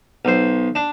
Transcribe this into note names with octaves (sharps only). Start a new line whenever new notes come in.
B1 C5
D4